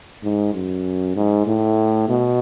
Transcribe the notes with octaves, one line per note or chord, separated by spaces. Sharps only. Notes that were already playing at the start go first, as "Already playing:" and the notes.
G#2
F#2
G#2
A2
B2